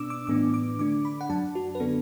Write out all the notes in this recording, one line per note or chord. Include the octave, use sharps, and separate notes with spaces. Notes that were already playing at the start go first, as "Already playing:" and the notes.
Already playing: B2 B3 D4 D6 E6
D6
A2 E3 B3 D4 D6
D6
D3 A3 D4 D6
B5
F#5
F#2 F#3 D4 A5
F#4
B4
D3 B3 D4 A4